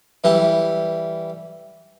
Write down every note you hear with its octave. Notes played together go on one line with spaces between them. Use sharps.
E3 G3 E4 A4